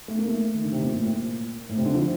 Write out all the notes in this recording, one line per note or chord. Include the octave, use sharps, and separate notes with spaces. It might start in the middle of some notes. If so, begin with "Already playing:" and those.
A3
A#3
A3
D#3
D3
C3
A#2
A2
A#2
A2
C3
D3
F3